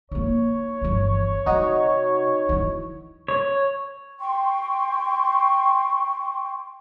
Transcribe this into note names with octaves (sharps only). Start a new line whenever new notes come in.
A#3 D#4 C#5
G1 E3
C3 D#4 F#4 D#5
E3 E4
C#5
G5 C6 C#6